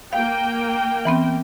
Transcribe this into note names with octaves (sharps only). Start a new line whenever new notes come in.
A#3 F5 G5
E3 B3 C4